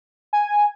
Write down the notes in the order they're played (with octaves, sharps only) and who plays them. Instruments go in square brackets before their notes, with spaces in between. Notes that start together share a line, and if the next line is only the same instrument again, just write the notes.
[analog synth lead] G#5